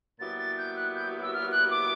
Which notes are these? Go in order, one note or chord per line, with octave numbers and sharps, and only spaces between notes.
A#2 F#3 B3 E4 G4 A6
A6
G6
F#6
G6
E6
F6
F#6
D6